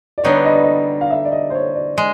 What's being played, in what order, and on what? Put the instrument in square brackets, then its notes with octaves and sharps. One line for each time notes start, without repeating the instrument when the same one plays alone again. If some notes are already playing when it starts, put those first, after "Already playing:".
[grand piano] D5
[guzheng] D3 G3 B3 D#4 [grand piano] C#5
[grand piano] D#5
D5
D#5
F5
E5
D5
D#5
C5
C#5
D5
[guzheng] G#3